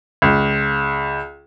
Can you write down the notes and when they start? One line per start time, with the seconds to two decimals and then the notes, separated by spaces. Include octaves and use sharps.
0.22 C#2